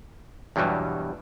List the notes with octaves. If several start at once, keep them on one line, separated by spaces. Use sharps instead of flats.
E2 G2 B2 F#3 G3